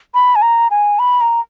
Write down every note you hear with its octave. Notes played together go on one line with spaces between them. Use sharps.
B5
G#5
A#5
G#5
B5
A#5